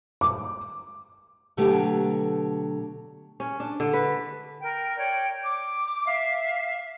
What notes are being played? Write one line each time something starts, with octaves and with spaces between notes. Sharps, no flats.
D6
B2 D3 F#3 A3 B3 G4
C#4
D4
D3
B4
A#4 G5
C#5 D5 G5
D6
E5 F5